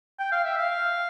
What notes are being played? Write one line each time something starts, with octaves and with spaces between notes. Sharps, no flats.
G5
F5
E5
F5